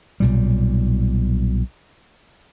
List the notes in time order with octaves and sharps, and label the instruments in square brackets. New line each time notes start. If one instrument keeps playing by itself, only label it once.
[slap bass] B1 A#2 G3